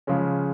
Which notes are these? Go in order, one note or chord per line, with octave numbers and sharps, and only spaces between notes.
C#3 F3 G#3 C#4